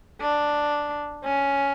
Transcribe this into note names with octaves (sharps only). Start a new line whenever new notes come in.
D4
C#4